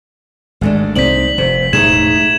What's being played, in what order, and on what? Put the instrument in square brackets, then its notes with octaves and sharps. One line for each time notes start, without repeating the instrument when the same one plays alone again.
[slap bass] G#1 G#2 [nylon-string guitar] G#3 A3 D4
[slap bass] C2 C4 [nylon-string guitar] D#4 C5 D5 [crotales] B6 F#7
[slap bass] F1 C3 [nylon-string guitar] C5
[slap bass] E1 A2 G#3 [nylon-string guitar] A3 D#4 G#4 [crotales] G#6 E7